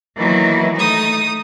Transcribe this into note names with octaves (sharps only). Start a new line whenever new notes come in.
D#3 E3 F#3 A#3 B3 E4
A3 D#4 D#6